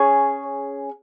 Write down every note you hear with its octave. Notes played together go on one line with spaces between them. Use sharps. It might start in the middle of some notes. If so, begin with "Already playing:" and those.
Already playing: C#4 G#4 C#5